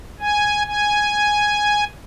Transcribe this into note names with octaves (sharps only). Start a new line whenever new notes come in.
G#5
G#5